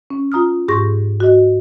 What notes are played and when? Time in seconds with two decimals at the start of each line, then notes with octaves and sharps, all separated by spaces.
0.10 C#4
0.32 F4 A#5 D#6 F6
0.68 G#2 G4 G#4 C6 C#6 A#6
1.20 F#4 D#5